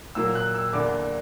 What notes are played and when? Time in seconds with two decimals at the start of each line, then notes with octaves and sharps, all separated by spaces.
0.15 A#2 F#3 A#3 E6
0.35 F#6
0.55 E6
0.73 E2 D3 A#3 D4 D6